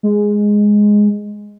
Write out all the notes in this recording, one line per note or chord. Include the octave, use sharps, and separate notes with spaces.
G#3